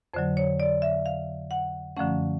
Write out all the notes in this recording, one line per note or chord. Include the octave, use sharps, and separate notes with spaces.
F2 D3 F#3 C5
C#5
D5
E5
F5
F#5
F#2 D3 F3 A3 C#4 F#5